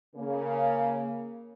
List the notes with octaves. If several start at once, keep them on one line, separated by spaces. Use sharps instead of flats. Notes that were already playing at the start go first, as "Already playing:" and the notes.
C#3 A#3